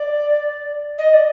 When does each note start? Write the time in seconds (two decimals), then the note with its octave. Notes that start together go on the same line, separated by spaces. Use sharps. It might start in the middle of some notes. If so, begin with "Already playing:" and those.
Already playing: D5
0.98 D#5
1.13 D5